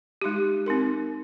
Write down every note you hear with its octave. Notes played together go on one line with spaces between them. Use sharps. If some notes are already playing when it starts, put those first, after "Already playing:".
G#3 D#4 G4
C4 D#4 A#4